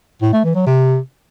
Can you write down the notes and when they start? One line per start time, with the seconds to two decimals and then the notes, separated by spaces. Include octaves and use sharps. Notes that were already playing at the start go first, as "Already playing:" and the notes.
0.22 A2
0.33 A3
0.44 E3
0.55 F#3
0.67 C3